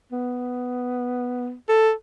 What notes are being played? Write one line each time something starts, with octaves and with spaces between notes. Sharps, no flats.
B3
A4